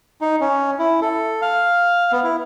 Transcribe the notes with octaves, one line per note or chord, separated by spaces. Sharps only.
D#4
C#4
E4
A4
F5
B3
E4